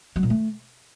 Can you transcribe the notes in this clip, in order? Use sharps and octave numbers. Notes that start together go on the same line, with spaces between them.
F#3
A#2
A3